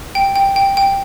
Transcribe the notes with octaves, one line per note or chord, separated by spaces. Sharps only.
G5
G5
G5
G5